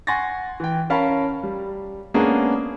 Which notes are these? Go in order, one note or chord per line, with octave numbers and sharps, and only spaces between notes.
F#5 G#5 C6 C#6 A6 A#6
E3 G5
C#4 A#4 F5 A5 B5 C#6
G3
G#3 A#3 B3 C#4 D4 G#4